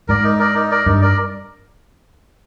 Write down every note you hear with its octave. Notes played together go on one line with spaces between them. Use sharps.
G#2 A#4 D5
D#4
A#4 D5
D#4
A#4 D5
G2 D#4
A#4 D5